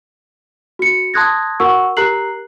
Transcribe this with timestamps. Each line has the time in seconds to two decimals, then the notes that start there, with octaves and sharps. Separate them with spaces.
0.79 F#4 C#7
1.14 A5 C6 D#6 F#6 G#6 A#6
1.60 F#4 A#4 F#5 C#6 E6
1.97 G4 A#4 A#5 F#6 C7 F#7